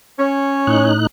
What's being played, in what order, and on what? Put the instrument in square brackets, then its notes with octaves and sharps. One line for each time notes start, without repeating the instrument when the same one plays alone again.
[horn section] C#4 C#5
[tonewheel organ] A2 D#4 F#6